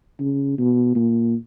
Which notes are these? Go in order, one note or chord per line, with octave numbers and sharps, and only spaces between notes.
C#3
B2
A#2